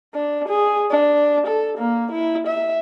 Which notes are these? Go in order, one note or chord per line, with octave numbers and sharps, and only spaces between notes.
D4
G#4
D4
A4
A#3
E4
E5